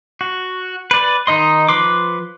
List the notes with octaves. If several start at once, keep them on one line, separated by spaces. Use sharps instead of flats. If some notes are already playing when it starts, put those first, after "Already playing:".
F#4
B4 D5
D#3 D#4 D#5 C6
F3 B4 C6 D6